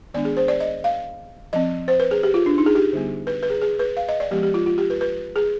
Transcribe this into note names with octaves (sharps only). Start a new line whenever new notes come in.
D#3 G#3 B3 D4 D5
G#4
C5
D5
D#5
F5
F3 C4 D#5
C5
B4
G#4
G4
F4
D4
D#4
G#4
G4
D3 G3 B3
B4
B4
G#4
G#4
B4
F5
D#5
D5
F3 G#3 B3 G4
G4
F4
F4
G4
B4
B4
G#4